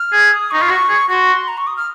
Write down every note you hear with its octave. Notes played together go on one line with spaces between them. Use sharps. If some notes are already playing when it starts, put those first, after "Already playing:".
Already playing: F6
G#4
D#6
D#4 C#6
F4
F#4
G#4
F#4 C6 C#6
A#5
C#6
D#6
F6